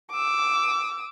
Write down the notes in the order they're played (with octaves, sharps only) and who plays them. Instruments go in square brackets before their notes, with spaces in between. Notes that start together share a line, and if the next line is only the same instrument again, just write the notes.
[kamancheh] D6 E6